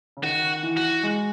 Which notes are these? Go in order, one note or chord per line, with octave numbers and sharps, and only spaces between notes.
C#3
D#3 F#4
E3
F#4
G#3